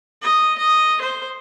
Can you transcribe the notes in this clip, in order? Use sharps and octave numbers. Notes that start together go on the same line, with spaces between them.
D#5
D#5
C5